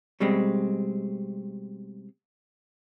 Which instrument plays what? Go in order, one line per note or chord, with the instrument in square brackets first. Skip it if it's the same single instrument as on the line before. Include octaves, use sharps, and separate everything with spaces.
[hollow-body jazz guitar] B2 G3 G#3 C4